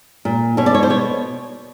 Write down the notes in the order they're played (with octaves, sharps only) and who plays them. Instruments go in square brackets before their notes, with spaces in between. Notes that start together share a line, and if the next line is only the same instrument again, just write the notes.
[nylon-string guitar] A#2
B2 C#5
D5
C#5
C5
B2 C#5